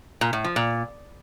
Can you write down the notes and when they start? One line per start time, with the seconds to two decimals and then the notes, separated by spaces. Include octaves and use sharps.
0.21 A#2
0.33 A2
0.44 F3
0.56 A#2